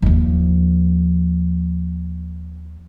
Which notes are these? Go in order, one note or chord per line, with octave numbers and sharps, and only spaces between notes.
D#2 F3